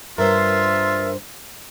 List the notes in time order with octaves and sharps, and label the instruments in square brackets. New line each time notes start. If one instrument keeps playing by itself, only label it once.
[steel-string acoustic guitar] G2 C5 [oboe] F4 [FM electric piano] A#4 [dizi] E5